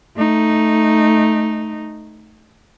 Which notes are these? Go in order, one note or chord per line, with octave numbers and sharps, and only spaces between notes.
A3 D#4